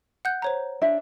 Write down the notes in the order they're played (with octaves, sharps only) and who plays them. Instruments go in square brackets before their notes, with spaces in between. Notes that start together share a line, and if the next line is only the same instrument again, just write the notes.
[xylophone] F#5 F#6 G6
C5 C#5 A#5
[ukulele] D4 E5